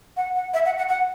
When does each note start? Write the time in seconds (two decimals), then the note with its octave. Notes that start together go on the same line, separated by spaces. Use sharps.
0.17 F#5
0.35 F#5
0.54 E5
0.66 F#5
0.78 F#5
0.89 F#5